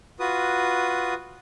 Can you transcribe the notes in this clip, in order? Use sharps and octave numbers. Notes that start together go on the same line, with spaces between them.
F4 F#4 B4 D#6